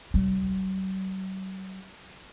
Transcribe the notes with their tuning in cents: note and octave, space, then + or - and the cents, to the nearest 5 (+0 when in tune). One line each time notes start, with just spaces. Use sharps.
F#3 +45